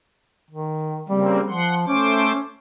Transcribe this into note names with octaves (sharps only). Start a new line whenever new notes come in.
D#3
C#3 G3 A#3 C4
F3 F#5 C6
A3 C#4 C5 D6